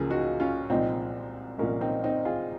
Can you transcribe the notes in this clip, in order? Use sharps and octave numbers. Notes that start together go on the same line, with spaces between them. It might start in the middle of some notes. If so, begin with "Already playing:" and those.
Already playing: C#2 C#3 F3 A#3 F4 G#4
D#4 F#4
C#4 F4
C2 A#2 F3 G#3 C4 D#4
C2 A#2 F3 G#3 A#3 C#4
C4 D#4
C4 D#4
F4 G#4